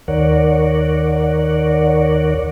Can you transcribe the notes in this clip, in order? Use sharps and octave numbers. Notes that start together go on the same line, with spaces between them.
D#2 D#3 A#4 C#5 D5 F#5